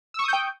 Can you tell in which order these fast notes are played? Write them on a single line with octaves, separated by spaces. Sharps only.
E6 C#6 D#6 G6 G5